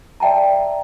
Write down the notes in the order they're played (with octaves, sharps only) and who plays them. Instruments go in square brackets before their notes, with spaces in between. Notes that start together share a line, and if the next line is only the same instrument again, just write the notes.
[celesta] D5 E5 G5 A5 A#5